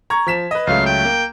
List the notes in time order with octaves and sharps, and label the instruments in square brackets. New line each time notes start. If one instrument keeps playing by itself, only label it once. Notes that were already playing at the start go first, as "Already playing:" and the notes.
[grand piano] A#5 C#6 G#6
F3 B6 E7
B4 D#5
[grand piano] C#2 F#3 A3 [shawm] F5
[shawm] G5
[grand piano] A#3